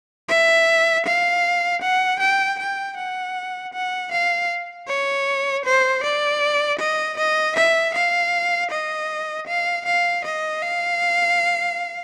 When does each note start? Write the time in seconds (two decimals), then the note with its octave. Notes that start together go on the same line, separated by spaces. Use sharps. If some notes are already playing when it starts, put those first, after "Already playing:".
0.29 E5
1.06 F5
1.82 F#5
2.20 G5
2.59 G5
2.97 F#5
3.73 F#5
4.11 F5
4.88 C#5
5.65 C5
6.03 D5
6.79 D#5
7.17 D#5
7.56 E5
7.95 F5
8.71 D#5
9.47 F5
9.86 F5
10.24 D#5
10.62 F5